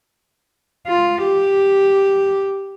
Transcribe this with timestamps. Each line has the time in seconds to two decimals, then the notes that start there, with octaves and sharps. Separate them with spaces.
0.88 F4
1.24 G4